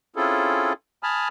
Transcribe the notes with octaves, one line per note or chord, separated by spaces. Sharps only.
C4 C#4 E4 F4 G#4 A4
G#5 A5 B5 D#6 F6